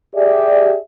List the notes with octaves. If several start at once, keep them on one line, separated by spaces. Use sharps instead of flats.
G4 G#4 D5 E5